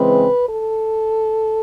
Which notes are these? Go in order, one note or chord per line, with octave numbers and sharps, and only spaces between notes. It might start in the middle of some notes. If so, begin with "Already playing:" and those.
Already playing: C#3 E3 G#3 C4 B4
A4